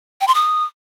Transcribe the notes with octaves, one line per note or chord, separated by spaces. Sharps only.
G5
C6
D#6